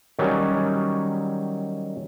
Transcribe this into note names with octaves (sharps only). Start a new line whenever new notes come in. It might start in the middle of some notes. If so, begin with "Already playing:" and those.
D#3 F#3 G3 C#4